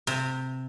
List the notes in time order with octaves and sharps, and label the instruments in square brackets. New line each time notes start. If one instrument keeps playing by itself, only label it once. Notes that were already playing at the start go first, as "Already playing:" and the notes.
[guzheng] C3